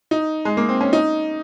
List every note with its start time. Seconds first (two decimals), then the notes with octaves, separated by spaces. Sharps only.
0.11 D#4
0.45 G#3
0.57 A#3
0.69 C4
0.81 C#4
0.93 D#4